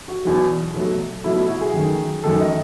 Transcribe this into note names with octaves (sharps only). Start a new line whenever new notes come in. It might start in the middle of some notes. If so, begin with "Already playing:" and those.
F#4
E2 B2 F#3
B2 F#3 A3
B2 F#3 A3 E4
E4
F#4
G#4
F#2 D#3 A3
F#2 D#3 A3 A4
D#5